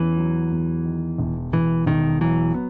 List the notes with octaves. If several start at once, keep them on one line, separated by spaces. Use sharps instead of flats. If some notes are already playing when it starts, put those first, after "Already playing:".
Already playing: E2 E3 C#4
F#3
E2
D#3
E1
E1 E3
E1 D#3
E3 F#3
B3